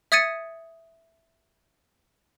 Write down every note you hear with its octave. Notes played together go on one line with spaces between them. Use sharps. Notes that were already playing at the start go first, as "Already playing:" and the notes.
E5 D#6 G#6 A6 C#7 D#7